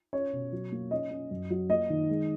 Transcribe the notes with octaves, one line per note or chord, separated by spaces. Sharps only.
C#4 C#5
B2
F#3
A#3
C#4 D#5
C#4
F#2
F#3
A#3 D#5
D#3
G#3